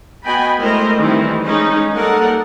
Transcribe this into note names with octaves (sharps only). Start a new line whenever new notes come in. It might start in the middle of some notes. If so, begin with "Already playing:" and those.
B3 F#4 D#5 G5 G#5 B5
G#3 A3 E4 A#4 C5 D#5
D#3 E3 G3 A3 C4
G#3 C#4 D#4
G3 A#3 D#4 A4 A#4 F#5